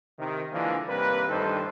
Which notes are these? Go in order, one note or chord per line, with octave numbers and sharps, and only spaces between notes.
C3 D#3
D3 E3 F3 G#3 A#3 D4
D#2 C3 G3 A#3 B4
A1 G2 D#3 D#4 A4 C5